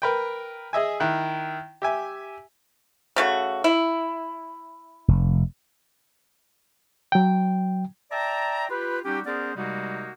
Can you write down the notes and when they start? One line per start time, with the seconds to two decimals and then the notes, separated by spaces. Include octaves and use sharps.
0.02 A#4 B4 G5
0.73 G#4 D#5 E5 G#5
1.00 D#3 E4 F#6
1.82 G4 E5 G#5
3.16 C#3 A3 F#4
3.64 E4
5.08 F1
7.12 F#3 G5
8.11 D5 E5 G5 A5 A#5
8.69 F4 G4 B4
9.04 G3 C#4 D#4 F#4 G4
9.25 B3 C#4 G#4 A#4 C5 D5
9.55 C3 G3 G#3 A#3 D#4 F#4